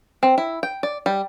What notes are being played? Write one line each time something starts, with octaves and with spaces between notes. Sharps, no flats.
C4
E4
G5
D5
G3